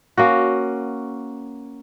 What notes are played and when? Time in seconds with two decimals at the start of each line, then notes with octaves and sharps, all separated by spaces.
0.17 A#3 C#4 F#4